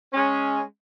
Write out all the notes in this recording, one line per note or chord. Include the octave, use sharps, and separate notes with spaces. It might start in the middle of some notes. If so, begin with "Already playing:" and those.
G#3 C#4